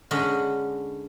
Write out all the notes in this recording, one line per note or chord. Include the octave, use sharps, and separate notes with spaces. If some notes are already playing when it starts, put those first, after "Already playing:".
D3 G#3 C#4 D#5 B5